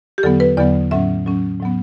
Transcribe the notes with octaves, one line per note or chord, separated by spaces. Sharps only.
G4
E2 D3 F#3 B3 A4
B4
E2 D3 F#3 B3 D5
A2 F#3 C#4 E5
A2 F#3 C#4
A2 F#3 B3